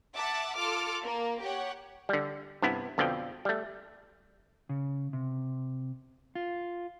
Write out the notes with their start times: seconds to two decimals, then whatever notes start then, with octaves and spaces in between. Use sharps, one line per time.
0.15 E5 F#5 A5 D6
0.55 F4 A4 D6 F6
1.03 A#3
1.42 G4 C#5 F#5
2.09 D3 G3
2.62 G2 C3 B3 E4
2.98 F2 B2 D3 F3 G5
3.45 G3 A3
4.69 C#3
5.13 C3
6.35 F4